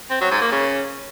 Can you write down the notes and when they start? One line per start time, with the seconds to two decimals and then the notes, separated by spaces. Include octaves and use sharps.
0.10 C4
0.20 F#3
0.31 G#2
0.41 A#3
0.51 C#3